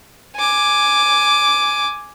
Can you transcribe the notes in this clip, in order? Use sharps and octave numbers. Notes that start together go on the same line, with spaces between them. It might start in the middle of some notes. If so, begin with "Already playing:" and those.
G#5 D6